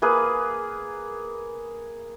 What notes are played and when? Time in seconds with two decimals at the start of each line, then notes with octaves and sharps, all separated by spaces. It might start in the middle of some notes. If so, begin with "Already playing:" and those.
0.02 A#3 G#4 B4